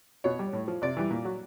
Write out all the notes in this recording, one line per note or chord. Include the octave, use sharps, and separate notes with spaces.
B2 C#5
G3
A2
F3
C3 D5
E3 G3
A#2
F#3